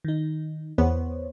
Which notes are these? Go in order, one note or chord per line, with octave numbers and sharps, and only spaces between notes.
D#3 D#4
E2 B3 C5 C#5